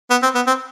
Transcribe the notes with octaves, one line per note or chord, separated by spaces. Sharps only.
B3
C4
B3
C4